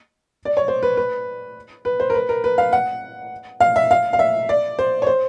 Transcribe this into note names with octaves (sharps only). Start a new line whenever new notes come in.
D5
C#5
C5
B4
B4
B4
C5
A#4
B4
A#4
B4
F5
F#5
F5
E5
F5
F5
E5
D5
C5
C#5
C5